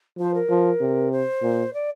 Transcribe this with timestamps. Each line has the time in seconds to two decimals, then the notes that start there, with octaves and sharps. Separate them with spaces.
0.18 F3 C5
0.34 A#4
0.50 F3
0.80 C3
1.11 C5
1.42 A#2
1.73 D5